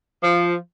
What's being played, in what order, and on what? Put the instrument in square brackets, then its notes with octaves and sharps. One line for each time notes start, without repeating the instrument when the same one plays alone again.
[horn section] F3